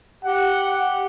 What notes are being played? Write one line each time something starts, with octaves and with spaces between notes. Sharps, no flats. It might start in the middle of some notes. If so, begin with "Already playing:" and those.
G4 F#5